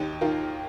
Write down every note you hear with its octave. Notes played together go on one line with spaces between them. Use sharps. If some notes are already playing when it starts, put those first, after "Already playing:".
Already playing: D#2 D#4 G4
D#3 F4 A#4